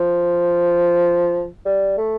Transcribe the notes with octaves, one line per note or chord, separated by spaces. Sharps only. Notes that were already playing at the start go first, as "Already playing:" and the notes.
Already playing: F3
G3
A3